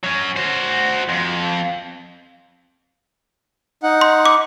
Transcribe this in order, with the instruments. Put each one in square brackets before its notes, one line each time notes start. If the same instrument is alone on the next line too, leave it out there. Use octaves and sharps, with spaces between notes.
[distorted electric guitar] F#3 C#4
F#4 C5
F2
[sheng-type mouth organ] D#4 F#5
[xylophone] C6
D6